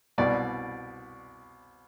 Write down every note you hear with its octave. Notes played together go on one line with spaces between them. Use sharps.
C2 B2 D5